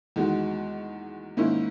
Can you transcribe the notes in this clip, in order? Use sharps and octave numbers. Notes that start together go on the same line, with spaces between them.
E2 D#3 G#3 D#4 F#4
G#2 D#3 A#3 C#4 E4